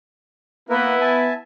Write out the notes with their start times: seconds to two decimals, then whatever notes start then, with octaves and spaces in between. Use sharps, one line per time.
0.69 A#3 B3 E4 A#4 B4
1.01 E5 G#5 A5